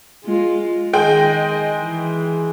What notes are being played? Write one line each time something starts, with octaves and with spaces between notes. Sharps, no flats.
G#3 F4
D#3 G#3 D#5 G5
E3